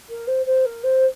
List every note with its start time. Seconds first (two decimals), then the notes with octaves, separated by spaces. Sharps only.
0.10 A#4
0.27 C5
0.46 C5
0.65 A#4
0.83 C5